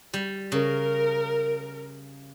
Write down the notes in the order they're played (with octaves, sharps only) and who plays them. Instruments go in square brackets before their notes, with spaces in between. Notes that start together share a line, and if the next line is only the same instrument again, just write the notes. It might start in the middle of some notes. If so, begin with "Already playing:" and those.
[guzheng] G3
[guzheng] C#3 [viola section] A#4